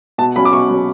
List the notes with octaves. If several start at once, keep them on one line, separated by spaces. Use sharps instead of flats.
B2 A5
F#3 C#4 B5
D6
B2 C#6
F#3 C#4